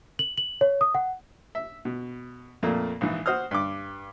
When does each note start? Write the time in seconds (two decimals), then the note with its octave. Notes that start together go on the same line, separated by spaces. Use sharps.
0.19 F#7
0.38 F#7
0.61 C#5
0.81 D#6
0.95 F#5
1.55 E5
1.85 B2
2.63 F2 A#2 A3 A#3
3.01 A#1 G#2 E3
3.26 F#4 C5 D#6 F6
3.51 G2 D6